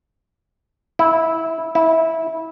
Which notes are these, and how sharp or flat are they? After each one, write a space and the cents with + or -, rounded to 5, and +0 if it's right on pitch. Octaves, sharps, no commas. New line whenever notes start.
E4 -15
E4 -20